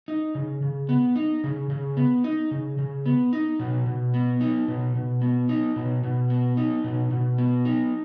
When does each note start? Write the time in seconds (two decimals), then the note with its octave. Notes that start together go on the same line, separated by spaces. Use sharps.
0.08 D#4
0.35 C#3
0.62 C#3
0.89 B3
1.16 D#4
1.44 C#3
1.70 C#3
1.97 B3
2.24 D#4
2.51 C#3
2.79 C#3
3.06 B3
3.33 D#4
3.59 B2
3.86 B2
4.14 B3
4.41 D#4
4.68 B2
4.95 B2
5.22 B3
5.49 D#4
5.76 B2
6.03 B2
6.30 B3
6.57 D#4
6.84 B2
7.11 B2
7.38 B3
7.65 D#4